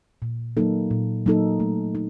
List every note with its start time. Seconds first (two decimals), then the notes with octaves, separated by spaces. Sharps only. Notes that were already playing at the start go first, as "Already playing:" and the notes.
0.22 A#2
0.57 F#3 A#3 D#4 A4
0.91 A#2
1.26 F#3 A#3 D#4 A4
1.60 A3
1.95 D#4